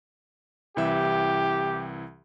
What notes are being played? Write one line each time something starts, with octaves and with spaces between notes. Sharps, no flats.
C2 E3 G4 E5